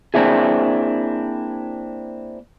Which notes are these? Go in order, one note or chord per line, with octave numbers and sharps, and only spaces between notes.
A#3 C4 D4 E4 G#4